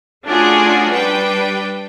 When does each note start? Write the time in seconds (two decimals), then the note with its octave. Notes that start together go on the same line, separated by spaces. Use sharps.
0.25 A3 C#4 D4 F4 F#4 G#4
0.89 G3 D4 B4 G5